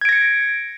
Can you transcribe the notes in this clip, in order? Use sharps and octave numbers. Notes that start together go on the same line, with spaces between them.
G#6 A#6 C#7 D7